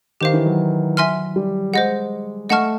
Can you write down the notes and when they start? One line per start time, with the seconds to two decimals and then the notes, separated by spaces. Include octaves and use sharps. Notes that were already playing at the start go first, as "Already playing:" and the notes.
0.21 D#3 G4 C5 F5
0.33 E3
0.46 F#3
0.97 E5 G#5 C6 F6
1.36 G3
1.73 G#3 C5 D#5 F#5
2.49 A3 D#5 F#5 A5 C#6 F6